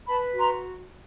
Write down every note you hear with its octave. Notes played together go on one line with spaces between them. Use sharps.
B4 A5 B5
F#4
A#5 C6